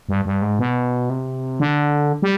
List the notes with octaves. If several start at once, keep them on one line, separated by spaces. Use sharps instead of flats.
G2
G2
G#2
B2
C3
D3
G3